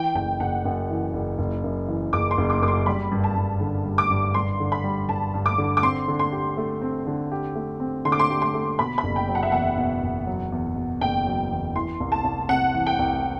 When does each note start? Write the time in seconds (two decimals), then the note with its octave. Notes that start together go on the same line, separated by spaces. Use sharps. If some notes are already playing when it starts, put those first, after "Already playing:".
Already playing: E3 G5
0.15 F#1 G5
0.40 F#1 F#5
0.65 F#2
0.90 E3
1.14 F#1
1.38 F#1
1.64 F#2
1.88 E3
2.13 F#1 D6
2.31 C6
2.38 F#1
2.50 D6
2.62 F#2 D6
2.68 C6
2.86 G3 B5
3.11 G2
3.24 A5
3.36 G2
3.61 D3
3.85 G3
3.98 D6
4.11 G2
4.34 G2 C6
4.60 D3
4.72 B5
4.84 G3
5.08 G2 A5
5.34 G2
5.46 D6
5.58 D3
5.77 D6
5.83 C4 C6
6.08 D3
6.19 C6
6.32 G4
6.57 A3
6.81 C4
7.07 D3
7.32 G4
7.56 A3
7.80 C4
8.05 D3 C6
8.12 D6
8.19 C6
8.30 G4
8.42 C6
8.54 A3
8.79 B2 B5
8.98 B5
9.03 F#1
9.16 G5
9.29 F#3
9.35 F#5
9.43 E5
9.52 E2 F#5
9.77 B2
10.03 F#1
10.27 F#3
10.52 E2
10.76 B2
11.01 F#1 G5
11.26 F#3
11.51 E2
11.76 E3 C6
12.00 C2
12.12 A5
12.24 C2
12.49 C3 F#5
12.74 E3
12.87 G5
12.99 C2